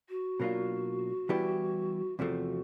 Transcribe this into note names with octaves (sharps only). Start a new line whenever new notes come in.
F#4
B2 F#3 A#3 D4 F4
E3 G3 B3 E4 G4
E2 C3 F3 A3 F#4